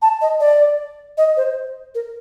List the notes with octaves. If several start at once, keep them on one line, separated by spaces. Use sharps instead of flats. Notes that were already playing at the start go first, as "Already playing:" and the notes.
A5
D#5
D5
D#5
C5
A#4